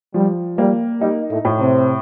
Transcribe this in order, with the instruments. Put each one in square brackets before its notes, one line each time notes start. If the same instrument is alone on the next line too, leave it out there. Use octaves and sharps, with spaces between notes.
[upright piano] F3 [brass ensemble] G3
[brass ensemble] G3 [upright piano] A#3
[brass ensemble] G3 [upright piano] D#4
[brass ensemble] A2 A3
[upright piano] A2
[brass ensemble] C3 C4